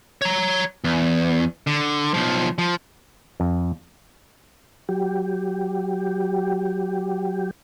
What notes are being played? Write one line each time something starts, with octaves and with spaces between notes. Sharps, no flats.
C#5 A#5
E2
D3
B1 F3
F3
F2
F#3 G4